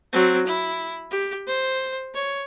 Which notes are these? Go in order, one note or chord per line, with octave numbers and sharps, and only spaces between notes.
F#3 C4
E4
G4
C5
C#5